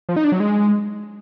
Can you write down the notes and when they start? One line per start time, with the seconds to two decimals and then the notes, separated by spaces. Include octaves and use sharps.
0.09 F3
0.16 D#4
0.24 D4
0.32 F#3
0.40 G#3